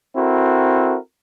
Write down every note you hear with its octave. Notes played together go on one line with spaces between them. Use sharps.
C4 E4 F#4 A4 A#4